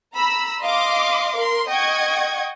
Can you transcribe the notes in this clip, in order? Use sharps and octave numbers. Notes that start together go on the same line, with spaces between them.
A#5 B5 E6
D#5 F5 C6 D6
A#4 C6
D#5 F#5 G5 C#6 G#6